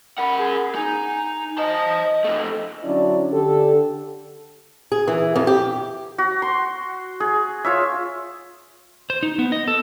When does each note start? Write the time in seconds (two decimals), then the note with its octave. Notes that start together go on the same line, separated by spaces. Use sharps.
0.19 A#4 F#5 B5
0.38 G#4
0.75 D#4 G#5
1.58 C5 D#5 A5
2.24 F2 A3
2.83 D3 F#3 C#4 D4 E4 D5
3.31 D3 G4 A4
4.92 G#4
5.08 E3
5.35 F2
5.47 G4
6.18 F#4
6.42 C6
7.20 G#4
7.64 F4 C#5 E5
9.10 C5
9.23 D#4
9.39 B3
9.52 D#5
9.68 A4